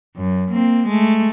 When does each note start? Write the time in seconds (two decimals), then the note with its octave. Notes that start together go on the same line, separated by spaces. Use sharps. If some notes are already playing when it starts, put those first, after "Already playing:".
0.16 F#2
0.51 A#3 C4
0.87 G#3 A3